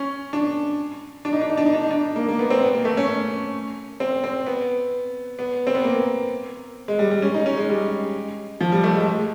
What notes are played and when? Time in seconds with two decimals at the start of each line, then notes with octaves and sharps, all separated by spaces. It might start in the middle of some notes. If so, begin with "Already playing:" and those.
Already playing: C#4
0.33 D4
1.25 D4
1.33 D#4
1.42 D4
1.50 D#4
1.57 D4
1.66 D#4
1.74 D4
1.83 D#4
1.91 D4
2.16 A#3
2.29 A#3
2.39 B3
2.50 C4
2.62 B3
2.75 A#3
2.85 A3
2.97 C#4
4.00 C4
4.24 C4
4.46 B3
5.39 B3
5.67 C4
5.75 B3
5.84 A#3
6.88 G#3
6.99 G3
7.11 G3
7.22 C#4
7.34 D#4
7.46 C#4
7.57 G#3
7.69 G3
8.61 F3
8.72 G3
8.84 A3
8.95 G#3
9.07 G#3